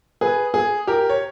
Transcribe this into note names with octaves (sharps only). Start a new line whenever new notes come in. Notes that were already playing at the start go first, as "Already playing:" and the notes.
G#4 B4
G#4
G4 A#4
C#5